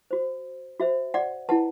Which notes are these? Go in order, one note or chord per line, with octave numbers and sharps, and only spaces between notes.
F#4 C5
F#4 C5 E5
D5 F#5
E4 B4 F#5 A5